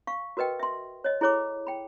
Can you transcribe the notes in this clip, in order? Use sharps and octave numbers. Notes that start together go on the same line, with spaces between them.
F5 C#6
F#4 A#4 B4 D#5 G5
E5 C6
C#5 D#5
E4 G#4 A4 C#5 B5 D6
G5 B5